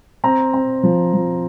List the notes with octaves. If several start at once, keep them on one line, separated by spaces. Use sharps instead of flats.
C4 A#5
C4
F3
F3